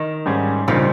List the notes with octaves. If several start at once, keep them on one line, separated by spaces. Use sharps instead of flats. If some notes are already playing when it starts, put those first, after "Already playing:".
Already playing: D#3
G#2 G3 C#4 G#4
A#1 A#2 C#3 G3 C4 D#4